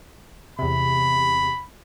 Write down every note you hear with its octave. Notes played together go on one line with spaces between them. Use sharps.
E2 C3 B5